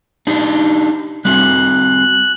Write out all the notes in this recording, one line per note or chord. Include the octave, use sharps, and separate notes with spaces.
D4 D#4 G4
G3 C4 F#4 F#6